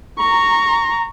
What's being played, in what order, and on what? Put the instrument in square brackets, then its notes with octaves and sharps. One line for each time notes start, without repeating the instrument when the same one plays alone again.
[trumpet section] A#5 [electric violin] C#6